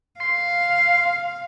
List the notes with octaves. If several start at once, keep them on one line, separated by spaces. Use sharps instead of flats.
F5 C6